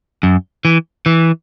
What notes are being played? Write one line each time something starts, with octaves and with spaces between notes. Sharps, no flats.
F#2
E3
E3